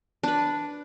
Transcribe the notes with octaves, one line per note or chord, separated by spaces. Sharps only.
D4 B4